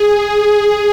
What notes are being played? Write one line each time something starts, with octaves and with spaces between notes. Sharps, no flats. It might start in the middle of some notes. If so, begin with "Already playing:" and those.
Already playing: G#4